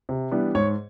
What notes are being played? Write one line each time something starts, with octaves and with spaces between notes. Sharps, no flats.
C3
E3 G3 B3 D4
G#2 C#5